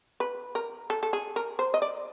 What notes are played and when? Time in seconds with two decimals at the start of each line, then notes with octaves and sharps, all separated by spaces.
0.20 B4
0.55 A#4
0.90 A4
1.03 A4
1.13 G#4
1.36 A#4
1.59 C5
1.74 D#5
1.82 D5